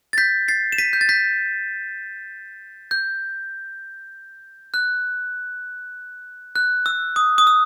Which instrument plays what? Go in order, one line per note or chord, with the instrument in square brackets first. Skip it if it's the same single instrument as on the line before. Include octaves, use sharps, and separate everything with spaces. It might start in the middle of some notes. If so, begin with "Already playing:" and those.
[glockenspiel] A6
G6 B6
A6 C7
E7
B6 D#7
G6
A6
G6 B6
G6
F#6
F#6
E6
D#6
D#6
E6